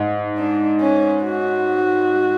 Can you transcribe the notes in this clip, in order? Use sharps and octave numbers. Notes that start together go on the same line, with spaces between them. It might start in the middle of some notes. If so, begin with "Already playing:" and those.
Already playing: G#2
D4
C#4
F#4